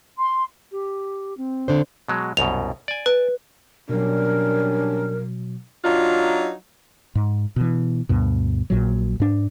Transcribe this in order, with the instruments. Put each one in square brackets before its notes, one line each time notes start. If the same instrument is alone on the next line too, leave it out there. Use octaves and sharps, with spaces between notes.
[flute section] C6
[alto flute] G4
C4
[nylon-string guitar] D3 D4 C5
[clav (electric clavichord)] B2 F#3 G#3
[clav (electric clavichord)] C2 F#2 B2 [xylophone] F7
[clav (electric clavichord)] D5 G#5
[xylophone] B4
[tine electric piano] B2 F#3 [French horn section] G3 C#4 D4 [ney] A#4
[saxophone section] F#3 D4 D#4 F4
[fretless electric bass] G#2
B2 E3
D2 G2 B2
A#1 A#2 F#3
G#2 D4